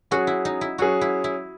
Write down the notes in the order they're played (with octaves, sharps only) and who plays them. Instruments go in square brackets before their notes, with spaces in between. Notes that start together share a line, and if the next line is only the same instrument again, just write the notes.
[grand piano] F#3 C#4 G#4 [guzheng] F#4
[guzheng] E4
D#4
E4
[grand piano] F#3 C#4 G#4 [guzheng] F#4
[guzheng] E4
E4